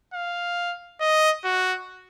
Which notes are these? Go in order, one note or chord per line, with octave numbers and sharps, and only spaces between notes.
F5
D#5
F#4